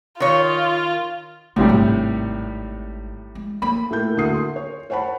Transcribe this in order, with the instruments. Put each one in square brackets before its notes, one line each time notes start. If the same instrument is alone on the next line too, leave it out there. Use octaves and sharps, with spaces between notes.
[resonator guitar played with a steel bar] D#3 C#5 [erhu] F4
[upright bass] A#1 [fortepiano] A2 C3 G3
[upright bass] G#1
G#3
[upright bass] A#3 [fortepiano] B5
[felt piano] A2 A#3 E4 G6
D2 A#3 F#4 A#4 D#6 C7
C6
C#5
C5 C#5 F#5 A5 B5